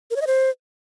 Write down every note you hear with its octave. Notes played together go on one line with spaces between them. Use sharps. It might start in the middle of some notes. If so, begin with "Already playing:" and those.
A#4
C#5
D#5
C5